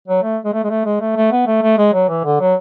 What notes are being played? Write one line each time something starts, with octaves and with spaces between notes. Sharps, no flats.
F#3
A3
G#3
A3
G#3
A3
G#3
A3
A3
B3
A3
A3
G#3
F#3
E3
D3
F#3